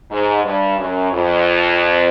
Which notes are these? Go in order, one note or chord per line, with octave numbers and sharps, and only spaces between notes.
G#2
G2
F#2
F2